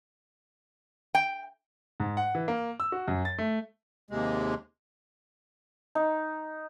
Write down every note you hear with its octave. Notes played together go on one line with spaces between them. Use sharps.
G5
G#2
F#5
E3
A#3
E6
F#4
F#2
A6
A3
D#2 C3 G#3
D#4